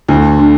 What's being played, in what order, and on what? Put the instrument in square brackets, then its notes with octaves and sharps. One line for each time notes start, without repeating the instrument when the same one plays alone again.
[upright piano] D2
D3